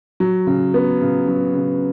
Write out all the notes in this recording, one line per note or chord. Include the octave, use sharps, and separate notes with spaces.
F#3
C#3
B3
C#3
F#3
C#3